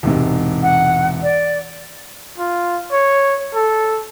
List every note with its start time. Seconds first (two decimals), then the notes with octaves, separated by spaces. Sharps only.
0.03 E1 G#2 C3
0.62 F#5
1.22 D5
2.38 F4
2.92 C#5
3.55 A4